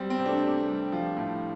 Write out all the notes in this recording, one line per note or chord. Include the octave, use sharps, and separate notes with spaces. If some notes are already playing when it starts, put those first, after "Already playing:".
Already playing: G3 C4
C4
C3
A3 D4
C3
G3
F3
A2